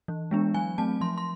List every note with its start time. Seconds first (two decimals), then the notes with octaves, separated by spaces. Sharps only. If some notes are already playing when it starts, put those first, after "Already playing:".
0.08 E3
0.31 G#3 B3 D4
0.54 F#3 G#5
0.78 A3 C4 A5
1.01 F3 C6
1.18 C6